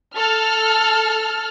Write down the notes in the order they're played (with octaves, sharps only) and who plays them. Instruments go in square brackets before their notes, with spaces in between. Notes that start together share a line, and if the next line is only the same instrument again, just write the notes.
[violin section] A4 F6